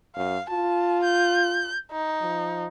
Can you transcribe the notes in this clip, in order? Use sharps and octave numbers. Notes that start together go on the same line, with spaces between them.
F#2 F5
F4 A5
G6
D#4
F3